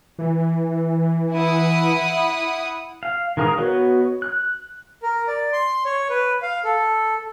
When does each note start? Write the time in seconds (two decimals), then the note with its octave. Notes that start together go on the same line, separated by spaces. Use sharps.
0.19 E3
1.34 E4 F#5 D#6
3.03 F5
3.37 D#3 G#3 A#4 F5 D#6
3.58 B3 F#4 B4 C#5 D#5
4.22 F#6
5.03 A#4
5.27 D5
5.53 C6
5.85 C#5
6.10 B4
6.42 F5
6.64 A4